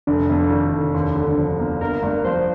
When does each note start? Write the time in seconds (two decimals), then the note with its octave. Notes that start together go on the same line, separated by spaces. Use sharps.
0.07 F1 D4
0.30 F2
0.51 D#3
0.72 F1
0.94 D#2
1.16 D3
1.37 F3
1.60 A#3
1.81 G1 A#4
2.03 G2
2.24 F3 C5